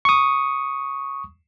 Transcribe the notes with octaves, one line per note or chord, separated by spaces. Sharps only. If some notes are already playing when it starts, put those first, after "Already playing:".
C#6 D#6